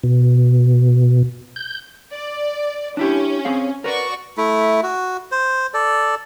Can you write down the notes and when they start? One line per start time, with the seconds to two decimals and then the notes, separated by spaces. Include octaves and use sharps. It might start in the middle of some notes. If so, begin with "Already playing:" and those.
0.03 B2
1.56 G6
2.12 D5
2.97 C#4 D4 E4 G4
3.45 C4 G#4 F5
3.84 F#4 A#4 B4 D5 C#6
4.37 A3 E4
4.83 F#4
5.32 C5
5.74 A4 D5